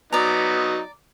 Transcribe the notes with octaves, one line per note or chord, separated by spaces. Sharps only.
F#3 B3 D#4 D5 A#5